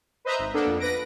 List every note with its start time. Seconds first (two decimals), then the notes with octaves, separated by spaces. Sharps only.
0.25 B4 C5 D#5 E5 A#5
0.39 G#1
0.53 A#3 B3 D4 A4
0.66 F2
0.79 B4 A#6 D7